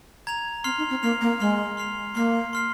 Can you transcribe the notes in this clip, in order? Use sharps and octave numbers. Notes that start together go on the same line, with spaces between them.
A#5 G#6 F7
C4 C6 F6 C7 F7
D#4
C4
A#3 C6 F6 C7 F7
A#3
G#3 C6 F6 C7 F7
C6 F6 C7 F7
A#3 C6 F6 C7
C6 F6 C7